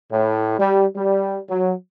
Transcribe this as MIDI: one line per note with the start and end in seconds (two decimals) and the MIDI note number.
0.12 0.58 45
0.59 0.86 55
0.96 1.40 55
1.49 1.74 54